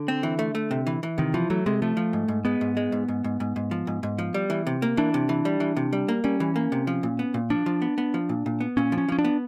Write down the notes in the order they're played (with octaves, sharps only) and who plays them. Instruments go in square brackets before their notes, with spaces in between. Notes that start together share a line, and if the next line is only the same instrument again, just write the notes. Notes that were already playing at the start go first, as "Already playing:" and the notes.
Already playing: [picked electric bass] D3
[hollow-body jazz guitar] C4
E3
A3
A3
C3
E3
E3
[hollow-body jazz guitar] C3 [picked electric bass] D#3
[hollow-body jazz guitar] E3 [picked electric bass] F3
[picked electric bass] F#3 [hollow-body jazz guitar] A3
[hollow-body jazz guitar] C3 [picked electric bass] G#3
[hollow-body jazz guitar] F3 [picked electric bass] A3
[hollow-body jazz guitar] F3
G#2
G#2
[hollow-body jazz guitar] G#3 [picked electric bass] B3
[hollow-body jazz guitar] G#2
G#3
G#2
G#2
G#2
G#2
G#2
F3
G#2
G#2
F3
G3
E3
C3
A#3
[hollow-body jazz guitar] E3 [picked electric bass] D4
[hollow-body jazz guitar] C3
E3
G3
E3
C3
G3
A#3
[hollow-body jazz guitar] G3 [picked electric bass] C#4
[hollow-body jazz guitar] E3
A#3
C3
F3
A#2
B3
A#2
[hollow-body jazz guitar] F3 [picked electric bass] D4
[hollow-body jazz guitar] F3
B3
B3
F3
A#2
A#2
B3
[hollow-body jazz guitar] A#2 [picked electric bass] C#4
[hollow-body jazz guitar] F3
[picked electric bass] C#4
[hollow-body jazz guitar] F3 [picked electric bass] C#4
[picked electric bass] D4
[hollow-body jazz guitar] B3